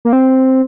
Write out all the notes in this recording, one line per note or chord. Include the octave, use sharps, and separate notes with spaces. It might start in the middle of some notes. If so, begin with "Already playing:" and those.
A#3
C4